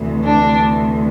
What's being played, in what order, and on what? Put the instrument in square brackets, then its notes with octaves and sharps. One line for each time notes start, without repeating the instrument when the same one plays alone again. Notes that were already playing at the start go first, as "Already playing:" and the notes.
Already playing: [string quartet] D2 C3 E3
D4